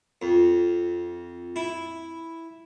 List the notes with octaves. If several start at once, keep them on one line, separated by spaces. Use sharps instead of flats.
F2
E4